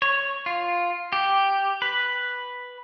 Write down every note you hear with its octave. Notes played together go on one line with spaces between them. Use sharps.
C#5
F4
G4
B4